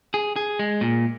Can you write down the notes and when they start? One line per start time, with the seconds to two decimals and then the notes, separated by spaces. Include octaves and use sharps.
0.14 G#4
0.36 G#4
0.59 G#3
0.81 A#2